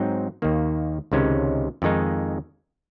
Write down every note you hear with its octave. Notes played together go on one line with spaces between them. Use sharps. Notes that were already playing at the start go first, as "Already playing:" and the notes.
Already playing: G#2 F#3 C4 D#4
D#2 D#3 A#3
C#2 C3 D#3 G#3 C#4
F2 D#3 G#3 D#4